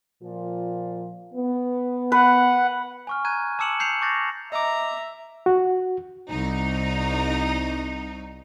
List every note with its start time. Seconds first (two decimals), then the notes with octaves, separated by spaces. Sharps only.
0.22 A#2 F3 F4
1.34 B3
2.12 B4 F#5
3.07 G#5 C#6 F6
3.25 A#5 F#6 G#6 D#7
3.59 A5 D6 E6 C#7 E7 F#7
3.80 G6 C7 C#7 F7
4.01 C#6 D6 F#6 G6 A6 A#6
4.52 D#5 E5 A#5 D6
5.46 F#4
6.29 C2 D#4